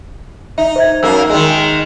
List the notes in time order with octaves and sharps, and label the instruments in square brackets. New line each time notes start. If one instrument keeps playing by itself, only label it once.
[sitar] D#4 [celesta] E5
[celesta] C5 E5 G#6
[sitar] F#2 A#3 [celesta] E6
[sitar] D#3 G#3 [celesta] D#5